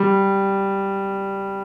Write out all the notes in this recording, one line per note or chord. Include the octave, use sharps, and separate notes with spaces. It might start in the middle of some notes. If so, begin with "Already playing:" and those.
Already playing: G3